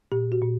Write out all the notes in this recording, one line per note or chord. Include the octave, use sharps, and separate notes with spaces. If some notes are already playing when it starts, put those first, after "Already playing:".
A#2 G4
F#4
A#2